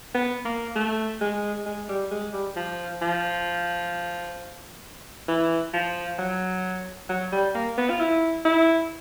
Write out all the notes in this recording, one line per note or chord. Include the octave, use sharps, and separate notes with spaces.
B3
A#3
A3
G#3
G#3
G3
G#3
G3
F3
F3
E3
F3
F#3
F#3
G3
A#3
B3
F4
E4
E4